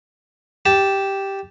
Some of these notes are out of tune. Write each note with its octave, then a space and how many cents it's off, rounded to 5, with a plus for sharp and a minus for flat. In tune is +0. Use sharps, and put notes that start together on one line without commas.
G4 +0 A5 +0